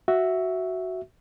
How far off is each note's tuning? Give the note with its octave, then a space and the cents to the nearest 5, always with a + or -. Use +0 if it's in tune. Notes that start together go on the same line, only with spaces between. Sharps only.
F#4 +5 E5 +0